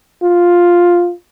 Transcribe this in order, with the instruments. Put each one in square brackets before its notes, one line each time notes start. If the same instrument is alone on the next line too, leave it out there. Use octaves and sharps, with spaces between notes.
[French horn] F4